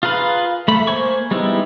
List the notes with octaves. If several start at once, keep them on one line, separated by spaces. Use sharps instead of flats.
F4 G#4 A#4 B4 F5
A3 B5
A#3 C5 G#5 C#6
G3 G#3 B3 D#4 E4